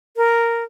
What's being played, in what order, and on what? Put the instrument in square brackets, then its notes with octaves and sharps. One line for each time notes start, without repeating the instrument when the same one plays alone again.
[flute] A#4